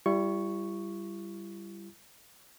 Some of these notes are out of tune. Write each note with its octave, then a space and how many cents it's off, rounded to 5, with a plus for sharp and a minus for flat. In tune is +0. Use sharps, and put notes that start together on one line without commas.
G3 +0 E4 +40 C#6 +0